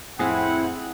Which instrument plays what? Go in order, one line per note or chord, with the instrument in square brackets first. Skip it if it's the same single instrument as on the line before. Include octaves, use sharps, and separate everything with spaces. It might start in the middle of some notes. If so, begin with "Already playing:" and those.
[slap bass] F2 A2 [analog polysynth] C4 E4 [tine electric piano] G#4 [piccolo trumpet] F#5